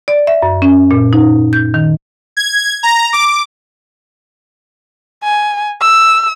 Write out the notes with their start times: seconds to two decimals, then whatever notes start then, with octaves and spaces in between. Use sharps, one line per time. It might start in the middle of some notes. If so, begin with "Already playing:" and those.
0.08 D5
0.27 E5
0.42 F#2
0.62 C#4
0.91 A#2
1.13 D#4
1.53 G6
1.74 D#3
2.37 G#6
2.83 A#5
3.13 D6
5.23 G#5
5.81 E6